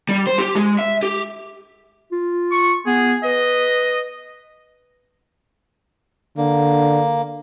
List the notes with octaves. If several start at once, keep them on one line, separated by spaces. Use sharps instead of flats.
G3
C5
G4
G#3
E5
G4
F4
C#6
B3 G#4
B4 D#5
D3 A#3